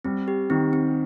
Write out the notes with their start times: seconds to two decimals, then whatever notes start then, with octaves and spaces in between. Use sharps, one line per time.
0.05 G3 C4
0.28 G4
0.50 D#3 C4
0.73 C4